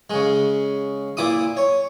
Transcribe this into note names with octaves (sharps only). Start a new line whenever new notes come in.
C#3 G#3
A#2 E4 D6 D#6
C#5